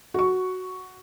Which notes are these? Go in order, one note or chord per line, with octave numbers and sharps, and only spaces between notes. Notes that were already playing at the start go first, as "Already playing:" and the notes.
F#4 C#6